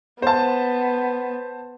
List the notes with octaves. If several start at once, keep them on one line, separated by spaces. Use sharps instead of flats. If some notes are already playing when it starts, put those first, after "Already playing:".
B3 C5 A5